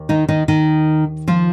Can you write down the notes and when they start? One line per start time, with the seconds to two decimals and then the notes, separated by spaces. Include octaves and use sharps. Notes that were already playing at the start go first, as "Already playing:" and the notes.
Already playing: D#2
0.09 D#3 D#4
0.28 D#3 D#4
0.48 D#3 D#4
1.28 F3 F4